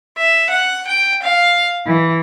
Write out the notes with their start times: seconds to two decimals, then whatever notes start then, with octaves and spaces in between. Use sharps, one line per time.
0.17 E5
0.49 F#5
0.88 G5
1.23 F5
1.85 E3